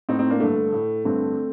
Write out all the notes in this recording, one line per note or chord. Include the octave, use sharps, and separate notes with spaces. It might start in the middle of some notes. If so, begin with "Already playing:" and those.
A2 C4 D#4
C4 D#4
A#3 D4
G2 D3 A3
A2
G2 D3 A3 C4